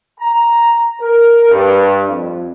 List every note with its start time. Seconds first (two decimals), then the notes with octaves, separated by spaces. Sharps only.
0.19 A#5
1.01 A#4
1.49 G2
2.08 F2